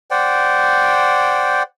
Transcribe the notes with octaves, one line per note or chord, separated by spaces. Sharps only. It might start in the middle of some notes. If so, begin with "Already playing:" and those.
C5 D5 F#5 G5